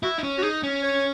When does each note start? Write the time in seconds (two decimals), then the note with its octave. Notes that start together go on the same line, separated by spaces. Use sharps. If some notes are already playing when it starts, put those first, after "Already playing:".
0.03 E4 F#4
0.18 D#4
0.23 C#4
0.38 F#4
0.43 D#4 G#4
0.63 C#4
0.83 C#5